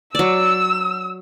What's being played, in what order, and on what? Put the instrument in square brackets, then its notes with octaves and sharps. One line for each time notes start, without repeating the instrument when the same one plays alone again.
[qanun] F#3 D5 [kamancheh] E6